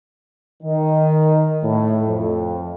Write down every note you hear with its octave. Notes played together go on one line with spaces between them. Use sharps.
D#3
A2
F2